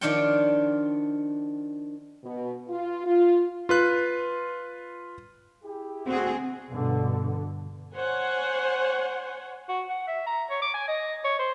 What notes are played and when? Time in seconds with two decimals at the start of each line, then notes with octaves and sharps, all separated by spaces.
0.01 D#3 F3 D4 F4 C#5 G5
2.24 B2
2.69 F4
3.05 F4
3.69 F4 B4 F#6
5.63 E4 G4 G#4
6.07 D2 C4 F#4 G#4 F#5
6.70 G2 B2 D3
7.95 C5 C#5 F#5 G#5
9.69 F#4
9.90 F#5
10.07 E5
10.26 A#5
10.50 C#5
10.62 D6
10.74 G#5
10.88 D#5
11.24 C#5
11.39 C5